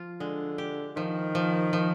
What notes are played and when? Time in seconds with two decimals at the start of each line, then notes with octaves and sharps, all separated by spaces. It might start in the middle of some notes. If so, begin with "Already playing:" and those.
Already playing: F3 F4
0.20 D3 G#3
0.58 G4
0.96 D#3 F3
1.35 F3
1.73 F3